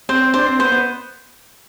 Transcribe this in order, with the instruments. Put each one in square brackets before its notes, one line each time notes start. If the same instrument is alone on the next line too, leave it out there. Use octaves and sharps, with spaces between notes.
[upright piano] C4 [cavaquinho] C5
[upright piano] C4
[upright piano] D4 [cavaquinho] C5
[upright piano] C4
[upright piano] B3 [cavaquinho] C5
[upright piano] B3